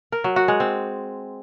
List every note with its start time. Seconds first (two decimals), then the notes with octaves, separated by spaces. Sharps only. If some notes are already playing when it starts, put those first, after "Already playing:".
0.12 A#4
0.24 F#3
0.36 F#4
0.48 G#3
0.60 C4